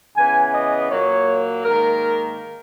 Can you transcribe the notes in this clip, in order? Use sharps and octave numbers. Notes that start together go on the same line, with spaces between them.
C#3 E3 B3 G#5
D#5
A#2 F#3 A#3 C#5
G#2 D#3 A#3 A#4